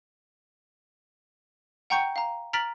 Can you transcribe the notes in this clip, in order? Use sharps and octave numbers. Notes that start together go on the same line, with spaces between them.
F#5 G5 A#5 C#6 G6 C#7
F5 A#5
A#5 F6 A6 B6 D7 F#7